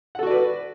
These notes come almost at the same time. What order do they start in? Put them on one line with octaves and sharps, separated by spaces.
F#5 A4 F#4 D5 B4